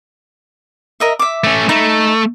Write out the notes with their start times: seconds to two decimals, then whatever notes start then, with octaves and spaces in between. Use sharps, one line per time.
1.00 A#4 D#5 E5
1.19 E5 D6
1.44 A3 C#4
1.69 A3 D#4 B5